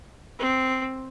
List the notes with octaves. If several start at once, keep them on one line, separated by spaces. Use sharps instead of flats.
C4